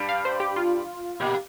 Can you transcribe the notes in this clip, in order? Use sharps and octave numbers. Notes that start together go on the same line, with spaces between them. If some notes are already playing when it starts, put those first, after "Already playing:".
Already playing: G2 G3
F5
C5
G4
F4
A#2 A#3 G4